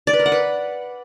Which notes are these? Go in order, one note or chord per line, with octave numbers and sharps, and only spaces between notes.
D5
B4
A#4
F#5
B4